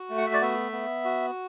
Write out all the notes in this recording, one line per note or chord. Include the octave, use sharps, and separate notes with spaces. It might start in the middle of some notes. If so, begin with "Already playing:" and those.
Already playing: F#4
A3
F#5
E5
D5
B3 E5
B3
F#4